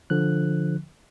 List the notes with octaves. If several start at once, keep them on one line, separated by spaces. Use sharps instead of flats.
D3 F3 F#6